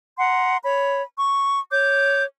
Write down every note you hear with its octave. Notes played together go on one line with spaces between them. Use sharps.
F#5 A#5 C6
C#5 B5
C#6
C#5 D6 G6